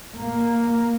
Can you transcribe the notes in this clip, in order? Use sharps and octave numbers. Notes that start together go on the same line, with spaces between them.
A#3